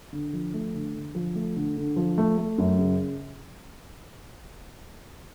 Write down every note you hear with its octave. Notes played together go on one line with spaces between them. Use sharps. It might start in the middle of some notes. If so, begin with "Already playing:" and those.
D3
F3
A3
D3
D3
F3
A3
D3
D3
F3
A3
A3
F#2
C#3